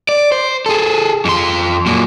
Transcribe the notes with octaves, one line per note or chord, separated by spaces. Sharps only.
D5
C5
G#4 A4
F2 C6
F#2 A#2